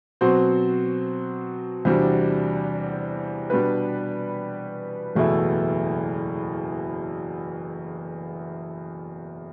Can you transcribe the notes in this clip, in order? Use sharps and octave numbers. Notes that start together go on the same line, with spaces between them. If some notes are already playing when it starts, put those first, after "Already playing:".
B2 F#3 C4 F#4 C5
E2 C3 G3 D4 F#4
B2 G3 D4 G4 B4
F#1 E2 B2 A3 E4